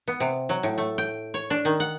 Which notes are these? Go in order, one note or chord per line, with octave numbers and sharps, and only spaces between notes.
B3
C3
F#3
A2
A3
G5
C#5
D4
D#3
F#5